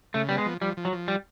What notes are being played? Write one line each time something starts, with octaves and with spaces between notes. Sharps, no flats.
C#3 A3
G3 B3
G#3
F3
F3 G3
F3
F#3
F3
G3